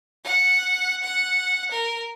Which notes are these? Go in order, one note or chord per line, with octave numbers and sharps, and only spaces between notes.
F#5
F#5
A#4